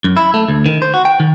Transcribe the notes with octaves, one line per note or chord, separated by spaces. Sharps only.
F#2
E4
A3
D2
D#3
C5
F#4
G5
D#3